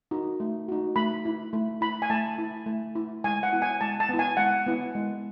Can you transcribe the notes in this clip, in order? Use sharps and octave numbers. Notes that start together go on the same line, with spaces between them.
D#4 F#4
A3
D#4 F#4
A3 B5
E4
A3
E4 B5
G#5
A3 A5
E4
A3
E4
G#3 G#5
F#5
B3 E4
G#5
G#3 A5
A5
B3 E4
G#5
G#3 F#5
B3 E4
G#3